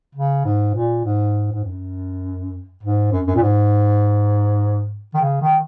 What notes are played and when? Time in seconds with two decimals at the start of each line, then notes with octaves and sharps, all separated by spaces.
0.15 C#3
0.45 G#2
0.74 A#2
1.05 G#2
1.52 G#2
1.64 F#2
2.83 G#2
3.12 F#2
3.27 F#2
3.35 A#2
3.42 G#2
5.14 D#3
5.21 C#3
5.41 D#3